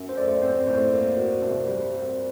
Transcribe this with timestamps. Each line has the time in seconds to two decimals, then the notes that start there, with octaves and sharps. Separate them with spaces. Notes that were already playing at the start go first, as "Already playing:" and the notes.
Already playing: F#2
0.09 C5
0.17 A3 D5
0.42 C4 C5
0.67 A2 C5
0.92 A#3
1.17 F#4
1.42 C2
1.67 G3
1.91 C4